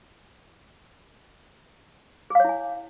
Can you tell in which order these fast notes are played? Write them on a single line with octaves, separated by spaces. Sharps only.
G#4 F5 C#5 E4 G#5